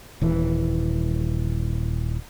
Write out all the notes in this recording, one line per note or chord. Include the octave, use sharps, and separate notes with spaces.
D#1 E3